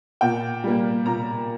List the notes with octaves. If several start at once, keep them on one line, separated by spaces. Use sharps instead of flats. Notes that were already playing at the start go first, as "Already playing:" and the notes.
A#2 G5
G3 A#3
A#2 A#5